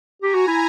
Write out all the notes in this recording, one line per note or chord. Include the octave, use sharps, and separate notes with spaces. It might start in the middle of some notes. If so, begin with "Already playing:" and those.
G4 G#5 A#5
F#4
E4